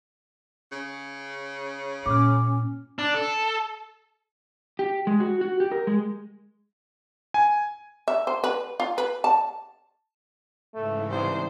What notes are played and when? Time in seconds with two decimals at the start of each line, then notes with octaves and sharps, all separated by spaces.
0.72 C#3
2.06 A#2 C#4 D6 F6
2.99 D4
3.14 A4
4.79 G4
5.07 G#3
5.20 F#4
5.41 F#4
5.60 G4
5.72 A#4
5.87 G#3
7.34 G#5
8.08 E5
8.27 C5
8.44 B4
8.80 F4
8.98 B4
9.24 A5
10.74 G#2 C#3 E3 A3
11.10 C2 C5